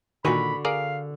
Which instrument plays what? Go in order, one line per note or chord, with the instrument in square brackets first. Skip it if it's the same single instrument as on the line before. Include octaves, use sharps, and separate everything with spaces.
[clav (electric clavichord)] A#2 D#3 [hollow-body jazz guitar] D3 F#4 G#5 [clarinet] B5
[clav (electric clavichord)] G#4 A#4 D5 [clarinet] F5